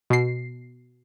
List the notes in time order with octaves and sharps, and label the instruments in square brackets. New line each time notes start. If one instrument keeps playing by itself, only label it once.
[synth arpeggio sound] B2 C7